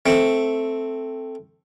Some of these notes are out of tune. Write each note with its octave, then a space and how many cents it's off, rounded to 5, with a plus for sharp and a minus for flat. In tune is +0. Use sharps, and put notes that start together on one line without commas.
A3 +0 C4 +0